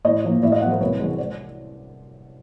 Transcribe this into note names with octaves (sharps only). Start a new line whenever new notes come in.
A2 C#5 D#5
F3 A#3
A2 D5 E5
D#5 F5
F#3 B3 A#4 C5 E5 F#5
C2 B4 C#5
C3 E3 G#3
C5 D5